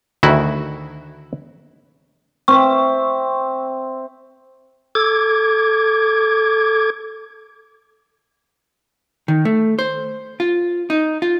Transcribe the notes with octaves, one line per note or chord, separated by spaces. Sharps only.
D2 D#3 E4 F#4
C4 E5 C#6
A4 D6 G#6
D#3
A3
C5
F4
D#4
F4